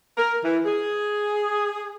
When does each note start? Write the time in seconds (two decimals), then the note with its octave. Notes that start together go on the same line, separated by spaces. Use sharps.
0.17 A#4
0.44 E3
0.65 G#4